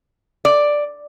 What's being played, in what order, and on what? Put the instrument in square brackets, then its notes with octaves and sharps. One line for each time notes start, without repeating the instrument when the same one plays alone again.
[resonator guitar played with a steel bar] D5